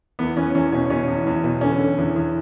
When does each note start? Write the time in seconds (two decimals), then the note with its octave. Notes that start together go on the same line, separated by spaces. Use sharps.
0.19 E2 B3
0.36 E2 C#4
0.55 E2 C#4
0.72 B2 C#4
0.90 B2 C#4
1.08 E2
1.27 E2
1.44 B2
1.61 D3 C#4
1.80 D3
1.98 E2
2.16 E2